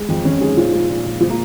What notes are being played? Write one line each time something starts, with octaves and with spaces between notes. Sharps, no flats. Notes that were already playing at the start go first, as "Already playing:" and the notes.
Already playing: G#3
F2
F2 C#4
D#3 G#3 G#4
A#2 F3 F4
G#3
A#2
A#2
F3 G#3 F4
A#3